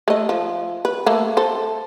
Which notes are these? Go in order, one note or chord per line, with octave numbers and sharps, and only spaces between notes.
A3 D#5
F3
B4
A3 A#3
A4 C5